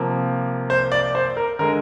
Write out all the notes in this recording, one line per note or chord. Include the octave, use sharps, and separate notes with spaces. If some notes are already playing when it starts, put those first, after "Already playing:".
Already playing: C3 F3 A#3
C5
D5
C5
A#4
D3 G#3 A#4